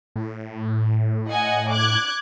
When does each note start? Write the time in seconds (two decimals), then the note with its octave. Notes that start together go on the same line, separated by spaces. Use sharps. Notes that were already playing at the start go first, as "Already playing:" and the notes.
0.16 A2
1.28 D#5 F#5 G#5
1.70 D6 F#6 G#6